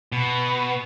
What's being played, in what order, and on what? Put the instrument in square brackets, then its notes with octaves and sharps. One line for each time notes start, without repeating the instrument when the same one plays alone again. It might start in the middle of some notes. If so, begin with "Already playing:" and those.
[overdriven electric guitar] B2